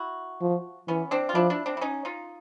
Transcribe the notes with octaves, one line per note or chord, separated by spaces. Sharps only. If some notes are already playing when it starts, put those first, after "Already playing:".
Already playing: E4 F#4
F3
E3 B3 C#4
C4 D4
F4
F3 D4 E4
D4 E4
C4 D4
E4
C#4 D#4
D#4 F4